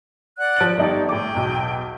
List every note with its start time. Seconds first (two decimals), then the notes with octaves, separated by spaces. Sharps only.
0.38 D5 F#5 F#6
0.56 F3 D7 F#7
0.77 G1 D#4 G4 A4 D5
1.09 A2 G#4 G5 D6
1.34 B1 E2